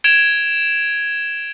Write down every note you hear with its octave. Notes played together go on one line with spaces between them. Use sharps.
G#6 D7 E7 F7 G7